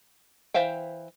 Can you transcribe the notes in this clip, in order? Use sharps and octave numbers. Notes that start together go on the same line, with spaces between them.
E3 C5 E5 F5 G5